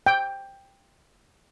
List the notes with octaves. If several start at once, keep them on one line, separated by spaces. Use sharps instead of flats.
G5